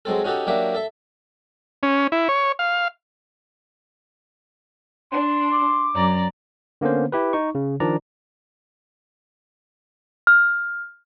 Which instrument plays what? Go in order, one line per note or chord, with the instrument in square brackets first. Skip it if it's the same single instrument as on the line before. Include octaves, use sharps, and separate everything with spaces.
[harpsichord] F#3 G#3 C4 A4
C#4 D#4 F#4 G4 A4
F#3 A#3 D4 G4 E5
A4 E5
[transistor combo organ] C#4
E4
C#5
F5
[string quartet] D4 [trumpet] C6
[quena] D6
[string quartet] F#2 D5 A#5
[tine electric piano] D3 A#3 B3 C#4 C5
E4 G4 B4
D#4 C#6
C#3
D#3 F3 D4 D5 A#5
[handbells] F6